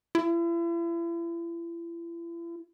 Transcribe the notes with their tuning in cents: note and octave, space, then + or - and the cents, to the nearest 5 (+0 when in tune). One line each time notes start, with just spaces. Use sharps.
E4 +40